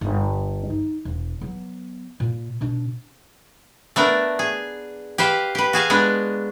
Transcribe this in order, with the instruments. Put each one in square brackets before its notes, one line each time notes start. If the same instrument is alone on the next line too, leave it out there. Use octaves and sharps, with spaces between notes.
[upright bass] G1
D#4
E1
F#3 B3
A#2
B2 D4
[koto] A3 B3 D4 A#4
G#4
G4 B4 C5 F5
G4 B4
F#4 G#4 F5 G#5
G#3 B3 D4